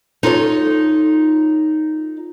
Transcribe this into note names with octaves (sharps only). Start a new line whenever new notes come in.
D#4 F4 A4 C#5